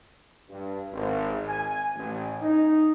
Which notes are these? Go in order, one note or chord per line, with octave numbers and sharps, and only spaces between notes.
G2
G#1
G#5
A1
D#4